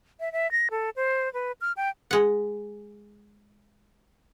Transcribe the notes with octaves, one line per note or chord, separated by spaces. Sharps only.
E5
E5
A#6
A4
C5
B4
F6
G5
G#3 F#5